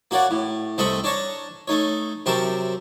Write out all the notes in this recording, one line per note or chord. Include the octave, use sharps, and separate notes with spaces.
A#3 F#4 C#5 D5 F#5
A2
C2 A3 C4 D#5 B5 C#6
D4 C#5 A5 A#5 C#6
A3 D#4 C#5
F#2 C3 C4 A#4 A5 C#6